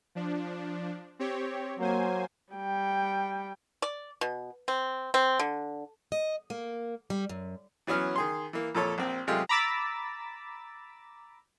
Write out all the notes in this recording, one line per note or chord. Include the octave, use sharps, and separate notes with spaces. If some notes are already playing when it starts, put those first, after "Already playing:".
F3 D4
C4 G4 C#5
F#3 A#3 C5 G#5
G3 G5
D5
B2
C4
C4
D3
D#5
A#3
G3
F#2
E3 F#3 B3 C#4 F6
D#3 G#4 C6
E3 A#3
F2 A#2 A4 C#5
A#1 C4
F#2 C3 G#3 A3 F4 G4
A#5 B5 D6 E6 A6 B6